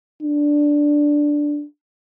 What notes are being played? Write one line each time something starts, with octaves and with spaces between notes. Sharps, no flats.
D4